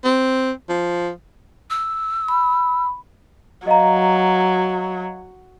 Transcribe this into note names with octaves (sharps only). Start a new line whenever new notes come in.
C4
F3
E6
B5
F#3 D#5 F5 A#5